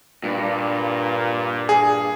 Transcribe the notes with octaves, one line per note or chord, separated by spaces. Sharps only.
G2 A#2
G#4